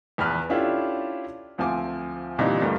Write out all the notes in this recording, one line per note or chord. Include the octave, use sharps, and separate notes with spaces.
A#1 E2 B4 F6
C#4 D4 E4 F4 G4 A4
D2 F3 C4 G#5 D6
A#2 D3 E3 G3 C4 D#4
D2 G2 G3 A3 A#3